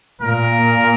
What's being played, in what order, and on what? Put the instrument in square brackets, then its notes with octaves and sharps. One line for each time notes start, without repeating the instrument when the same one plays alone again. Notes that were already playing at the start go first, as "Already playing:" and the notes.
[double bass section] A#2 A#3 [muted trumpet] A#4